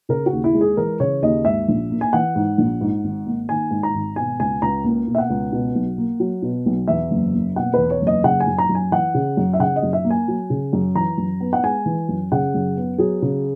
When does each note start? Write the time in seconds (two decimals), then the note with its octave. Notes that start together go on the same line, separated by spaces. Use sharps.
0.09 C#3 A#4
0.26 F#4
0.32 D#2
0.44 E4
0.54 G#3
0.61 G#4
0.77 E3 A#4
1.00 C#3 C#5
1.22 D#2 D#5
1.45 G#2 E5
1.68 A#1
1.90 A#3
2.01 G#5
2.13 E3 F#5
2.35 G#2
2.58 A#1
2.81 G#2
3.04 G#1
3.27 A#3
3.49 D#3 G#5
3.71 G#2
3.83 A#5
3.95 G#1
4.16 B2 G#5
4.39 C#2 G#5
4.62 C#2 A#5
4.84 A#3
5.07 B2
5.15 E5
5.18 F#5
5.30 C#2
5.52 B2
5.75 B1
5.98 A#3
6.20 F#3
6.42 B2
6.66 B1
6.88 E2 E5
7.11 F#1
7.33 A#3
7.56 B2 F#5
7.74 E2 B4
7.91 C#5
8.02 F#1
8.07 D#5
8.24 C#3 F#5
8.40 G#5
8.47 F#2
8.58 A#5
8.69 F#2
8.75 G#5
8.91 E3 F#5
9.14 C#3
9.37 F#2
9.53 E5
9.59 C#3 F#5
9.76 D#5
9.83 F#2
9.93 E5
10.04 A#3
10.10 G#5
10.28 F#3
10.50 C#3
10.73 F#2
10.95 E3 A#5
11.18 F#2
11.40 B3
11.53 F#5
11.63 G#3 G#5
11.86 E3
12.09 F#2
12.32 C#3 F#5
12.54 F#2
12.77 B3
12.98 F#3 G#4
13.22 C#3